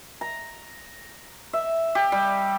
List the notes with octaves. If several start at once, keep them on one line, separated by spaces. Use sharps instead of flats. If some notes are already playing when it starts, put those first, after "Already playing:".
A#5
E5
G4
G3